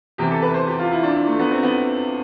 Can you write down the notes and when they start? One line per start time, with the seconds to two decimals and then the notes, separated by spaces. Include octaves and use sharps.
0.18 E2 C3 E3 G4
0.31 A4
0.42 B4
0.54 C5
0.67 G4
0.79 F4
0.91 E4
1.03 D4
1.15 E4
1.27 A3
1.39 B3
1.51 C4
1.63 B3